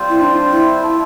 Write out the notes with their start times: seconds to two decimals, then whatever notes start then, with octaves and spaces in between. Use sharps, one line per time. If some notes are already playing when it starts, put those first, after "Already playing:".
Already playing: G3 C4 F4 C5
0.09 E4
0.21 D4
0.51 E4
0.82 A3 D4 F4 A4